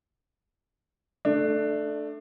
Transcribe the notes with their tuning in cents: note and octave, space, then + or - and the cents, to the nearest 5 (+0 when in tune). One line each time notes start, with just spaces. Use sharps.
A3 +0 D4 +20